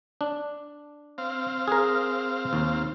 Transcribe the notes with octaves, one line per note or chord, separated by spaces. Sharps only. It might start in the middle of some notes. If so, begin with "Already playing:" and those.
D4
C4 F5
G#4 A#4
D#2